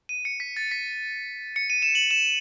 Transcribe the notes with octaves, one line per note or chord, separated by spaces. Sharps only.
D#7
C#7
B6
A6
B6
C#7
D#7
E7
F#7
E7